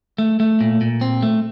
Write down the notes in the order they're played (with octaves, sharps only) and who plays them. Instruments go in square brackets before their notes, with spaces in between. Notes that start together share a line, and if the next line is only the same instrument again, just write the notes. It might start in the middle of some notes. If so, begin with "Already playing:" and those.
[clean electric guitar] A3
A3
A#2
A#2
C4
A3